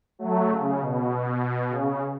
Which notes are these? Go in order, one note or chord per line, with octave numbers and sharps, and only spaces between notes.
F#3 A3
C#3
B2
C#3